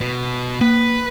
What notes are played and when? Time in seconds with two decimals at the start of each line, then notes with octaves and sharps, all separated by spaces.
0.01 B2
0.61 A#3 B4